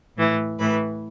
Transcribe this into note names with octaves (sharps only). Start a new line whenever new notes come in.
A2 E3
A2 E3 B4